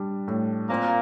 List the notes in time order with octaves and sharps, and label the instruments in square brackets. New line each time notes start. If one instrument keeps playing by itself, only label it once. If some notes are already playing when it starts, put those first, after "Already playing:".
Already playing: [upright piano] G3 D4
A2
[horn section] A#2 A#3 [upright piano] C4